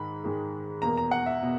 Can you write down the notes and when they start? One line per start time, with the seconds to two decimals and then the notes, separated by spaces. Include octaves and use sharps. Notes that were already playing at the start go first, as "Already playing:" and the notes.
Already playing: G#2 D#3 G#3 B5
0.24 G#2 D#3 G#3
0.82 E2 B2 A#3 A#5
0.97 A#5
1.11 F#5
1.26 E5
1.43 B2